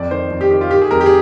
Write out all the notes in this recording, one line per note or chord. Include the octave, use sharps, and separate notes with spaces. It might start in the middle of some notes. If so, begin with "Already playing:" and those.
Already playing: F2 D5
D#3 C5
F2
G4
D#3 G4
F4
D#3 G4
G#4
F2 A#4
G4
G#4